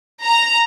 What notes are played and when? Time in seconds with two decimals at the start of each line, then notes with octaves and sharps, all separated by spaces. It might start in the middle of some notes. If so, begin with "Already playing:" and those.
0.25 A#5